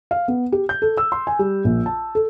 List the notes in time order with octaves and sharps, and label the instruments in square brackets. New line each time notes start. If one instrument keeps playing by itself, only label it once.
[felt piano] F5
B3
G4
G6
A4
E6
C6
G#5
G3
A#1
A5
A4